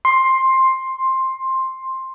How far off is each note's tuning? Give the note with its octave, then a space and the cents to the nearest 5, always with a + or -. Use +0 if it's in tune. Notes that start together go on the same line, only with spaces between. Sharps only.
C6 +10